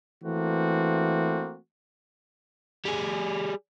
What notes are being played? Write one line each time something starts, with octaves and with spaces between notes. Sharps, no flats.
E3 A3 A#3 C4 F#4
G3 G#4